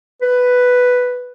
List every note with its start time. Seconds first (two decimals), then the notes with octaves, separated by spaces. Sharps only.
0.22 B4